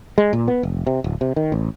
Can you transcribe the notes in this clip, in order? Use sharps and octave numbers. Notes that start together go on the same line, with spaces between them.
G#3
A#2
B3
F1
C3
D1
C3
D#3
A1